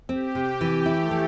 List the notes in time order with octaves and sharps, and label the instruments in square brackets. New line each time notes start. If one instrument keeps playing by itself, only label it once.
[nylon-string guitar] C4 [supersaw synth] G4
[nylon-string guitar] C3
E3
[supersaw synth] A3 [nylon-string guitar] E4
[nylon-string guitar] E3